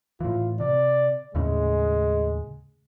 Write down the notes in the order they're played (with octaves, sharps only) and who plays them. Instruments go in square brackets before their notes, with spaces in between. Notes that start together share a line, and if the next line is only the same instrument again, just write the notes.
[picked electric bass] A2 E3 [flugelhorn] F4
[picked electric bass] C3 [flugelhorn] D5
[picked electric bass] D#2 A2 C#3 [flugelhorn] G#3